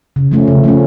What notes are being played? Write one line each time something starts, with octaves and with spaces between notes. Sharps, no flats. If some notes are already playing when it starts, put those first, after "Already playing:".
C#3
F3 A3 C#4
C#3
F3 A3 C#4